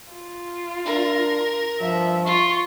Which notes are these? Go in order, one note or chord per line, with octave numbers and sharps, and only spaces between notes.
F4
D4 A#4
G2 F3 E5
F4 C#6